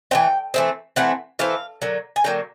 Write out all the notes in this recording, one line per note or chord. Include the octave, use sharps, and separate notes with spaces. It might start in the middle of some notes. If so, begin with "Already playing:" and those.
E3 A3 C4 G5
E3 A3 C4
E3 A3 C4 F#5
E3 A3 C4 F5
D3 F#3 A#3
G#5
D3 F#3 A#3 G5